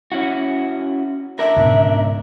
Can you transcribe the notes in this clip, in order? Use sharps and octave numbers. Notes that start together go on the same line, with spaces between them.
C#4 E4 F#4
D4 A#4 E5
C#2 G#2 B2